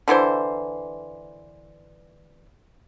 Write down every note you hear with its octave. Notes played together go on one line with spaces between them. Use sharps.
D3 E3 E4 C5